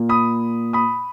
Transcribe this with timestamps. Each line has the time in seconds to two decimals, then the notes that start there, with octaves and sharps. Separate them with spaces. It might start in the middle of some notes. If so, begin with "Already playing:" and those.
Already playing: A#2 A#3
0.09 B5 D#6
0.73 B5 D#6